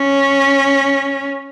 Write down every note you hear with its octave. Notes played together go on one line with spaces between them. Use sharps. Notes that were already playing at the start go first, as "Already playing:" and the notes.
Already playing: C#4